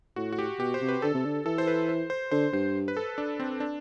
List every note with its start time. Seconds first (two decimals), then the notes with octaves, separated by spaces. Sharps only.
0.16 A2 F#4
0.32 F#4
0.39 G4
0.59 B2 G4
0.74 C5
0.81 C3
0.88 B4
1.02 D3 A4
1.14 C3
1.25 D3
1.45 E3 A4
1.58 C5
1.67 B4
1.89 C5
2.10 C5
2.31 D3 C5
2.53 G2 C5
2.88 B4
2.97 A4
3.18 D4
3.40 C4
3.60 D4